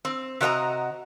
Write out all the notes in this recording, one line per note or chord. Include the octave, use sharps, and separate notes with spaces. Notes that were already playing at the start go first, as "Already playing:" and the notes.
C4
C3 F#4 D#5 F#5 A#5